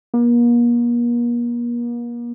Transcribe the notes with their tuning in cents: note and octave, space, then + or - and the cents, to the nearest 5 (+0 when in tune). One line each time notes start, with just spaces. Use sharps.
A#3 +40